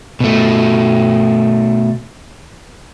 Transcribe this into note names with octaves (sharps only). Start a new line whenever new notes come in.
B2 A3